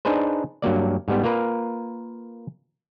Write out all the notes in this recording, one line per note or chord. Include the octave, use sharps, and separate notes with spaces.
D4 D#4 G#4 B4 C5
G2 F#3 A#3 D5
G#2 G3 B3
A#3 F4 A#4 B4